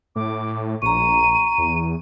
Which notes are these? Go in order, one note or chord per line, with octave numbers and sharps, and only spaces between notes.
A2 D6
A#1 A#5 C#6 D#7
E2